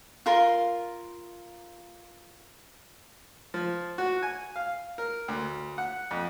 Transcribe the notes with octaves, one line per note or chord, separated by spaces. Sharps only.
F4 A#4 C6
F3
F#4
G#5
F5
A#4
D2
F#5
F2